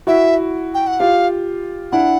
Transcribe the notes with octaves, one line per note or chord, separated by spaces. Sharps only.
E4 F#4 E5
G5
F#5
F4 G4 F5
D4 E4 F#5